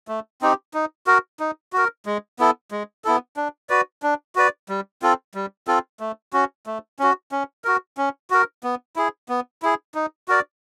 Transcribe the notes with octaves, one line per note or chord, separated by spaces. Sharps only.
A3
C4 D#4 G4
D#4
F#4 A#4
D#4
F#4 A#4
G#3
B3 E4 A4
G#3
B3 E4 A4
D4
F#4 B4 D5
D4
F#4 B4 D5
G3
C4 F4 A4
G3
C4 F4 A4
A3
C#4 F#4
A3
C#4 F#4
C#4
F#4 A#4
C#4
F#4 A#4
B3
E4 G#4
B3
E4 G#4
D#4
F#4 A#4 D5